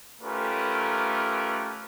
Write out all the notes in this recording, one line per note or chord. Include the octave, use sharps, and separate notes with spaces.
A3 C#4 F4 G4 A#4 B4